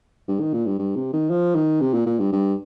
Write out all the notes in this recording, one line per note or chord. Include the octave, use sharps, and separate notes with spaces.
G2
D#3
A#2
G2
G2
C3
D#3
F3
D#3
C3
A#2
A#2
G2
G2